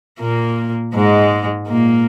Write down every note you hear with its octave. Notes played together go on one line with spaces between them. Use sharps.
A#2 A#3
G#2 G#3
A#2 A#3